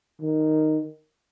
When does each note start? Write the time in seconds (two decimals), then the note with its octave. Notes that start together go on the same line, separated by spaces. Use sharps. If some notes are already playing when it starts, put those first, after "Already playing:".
0.21 D#3